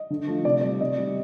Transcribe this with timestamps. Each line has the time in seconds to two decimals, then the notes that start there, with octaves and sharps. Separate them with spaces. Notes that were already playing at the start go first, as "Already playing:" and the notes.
Already playing: D#5
0.10 D3
0.27 F3 A3
0.45 C3 D5
0.61 G3 D5
0.80 C3 D#5
0.98 G3